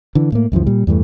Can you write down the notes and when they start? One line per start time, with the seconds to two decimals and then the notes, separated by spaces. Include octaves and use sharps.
0.15 D3 E3
0.32 A2 A#3
0.52 C#2 F#2 E3 F3
0.67 A#2 G3
0.87 E2 G2 E3 A3